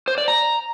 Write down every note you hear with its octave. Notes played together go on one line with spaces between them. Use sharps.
C5
D5
A#5